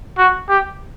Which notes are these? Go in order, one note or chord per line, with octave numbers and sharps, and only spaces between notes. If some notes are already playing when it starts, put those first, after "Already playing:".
F#4
G4